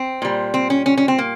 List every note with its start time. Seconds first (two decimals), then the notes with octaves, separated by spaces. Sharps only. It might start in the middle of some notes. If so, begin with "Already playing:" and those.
Already playing: C4
0.22 A#2 G3
0.54 C4
0.70 C#4
0.86 C#4
0.97 C#4
1.08 C4
1.18 A#3